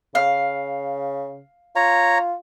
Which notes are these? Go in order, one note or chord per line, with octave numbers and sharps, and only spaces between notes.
C#3 F5
F4 C#5 A#5